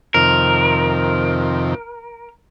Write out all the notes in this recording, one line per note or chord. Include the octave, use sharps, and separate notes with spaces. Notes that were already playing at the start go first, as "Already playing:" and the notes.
F2 C3 D#3 A#4